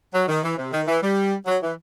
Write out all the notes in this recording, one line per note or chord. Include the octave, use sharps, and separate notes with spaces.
F#3
D#3
E3
C3
D#3
E3
G3
F#3
E3